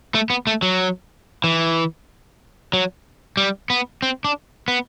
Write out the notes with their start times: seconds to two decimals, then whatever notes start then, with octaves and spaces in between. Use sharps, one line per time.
0.15 A3
0.30 B3
0.47 A3
0.62 F#3
1.44 E3
2.73 F#3
3.37 G3
3.70 B3
4.02 C4
4.25 D4
4.68 B3